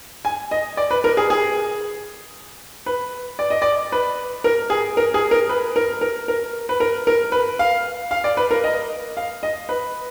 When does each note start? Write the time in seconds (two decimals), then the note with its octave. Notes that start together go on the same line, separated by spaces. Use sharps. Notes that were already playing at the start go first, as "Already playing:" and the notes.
0.25 G#5
0.51 D#5
0.77 D5
0.91 B4
1.04 A#4
1.17 G#4
1.30 G#4
2.86 B4
3.39 D5
3.50 D#5
3.62 D5
3.92 B4
4.44 A#4
4.70 G#4
4.97 A#4
5.14 G#4
5.31 A#4
5.49 B4
5.76 A#4
6.01 A#4
6.28 A#4
6.69 B4
6.80 A#4
7.07 A#4
7.32 B4
7.59 F5
8.11 F5
8.24 D5
8.37 B4
8.51 A#4
8.64 D#5
9.17 F5
9.43 D#5
9.69 B4